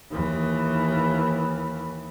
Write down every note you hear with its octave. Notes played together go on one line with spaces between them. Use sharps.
D#2 E3